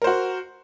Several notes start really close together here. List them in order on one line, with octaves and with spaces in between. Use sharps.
A#4 C5 F#4